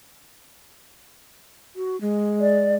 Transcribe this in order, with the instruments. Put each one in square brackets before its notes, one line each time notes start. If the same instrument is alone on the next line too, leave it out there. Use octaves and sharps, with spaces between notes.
[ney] F#4
G#3
[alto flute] D5